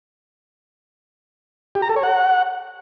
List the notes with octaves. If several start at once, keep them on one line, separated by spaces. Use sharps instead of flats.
G4
A#5
A4
C#5
F#5